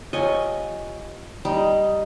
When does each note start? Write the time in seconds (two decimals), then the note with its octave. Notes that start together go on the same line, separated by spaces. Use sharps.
0.13 F4 G4 C#5 D#5 G#5
1.45 G3 D#4 D#5